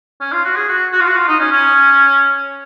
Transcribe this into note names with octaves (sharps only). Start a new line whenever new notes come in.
C#4
F4
F#4
G#4
F#4
F#4
F4
F#4
F4
D#4
C#4
C#4